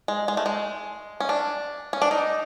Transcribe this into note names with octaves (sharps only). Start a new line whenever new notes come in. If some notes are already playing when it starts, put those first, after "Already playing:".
G#3
G#3
A3
G#3
C#4
D4
C#4
D4
D#4